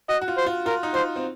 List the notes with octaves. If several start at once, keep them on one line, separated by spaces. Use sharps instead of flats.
F#4 D#5
F#4
F4
C5
F4
F4 A#4
D#4
F4 C5
C4